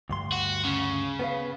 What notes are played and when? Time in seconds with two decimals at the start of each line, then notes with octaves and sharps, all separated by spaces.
0.09 D2 G2 C6
0.32 F#4
0.65 C#3
1.19 B3 B4 F5